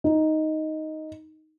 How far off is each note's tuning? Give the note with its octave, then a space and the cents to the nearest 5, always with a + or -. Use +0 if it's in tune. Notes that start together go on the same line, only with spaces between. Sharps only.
D#4 +5